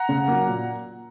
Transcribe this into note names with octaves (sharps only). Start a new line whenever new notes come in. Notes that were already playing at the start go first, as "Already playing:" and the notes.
Already playing: F#5 A#5
C#3
F#3 A#3
A#2